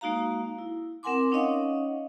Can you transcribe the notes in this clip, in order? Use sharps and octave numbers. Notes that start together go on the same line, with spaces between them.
G#3 A#3 D#4 F#4 F5 A#5
E4
C4 A#4 F#5 G#5 C6 D6
C#4 D#4 C#5 D#5 F5 F#5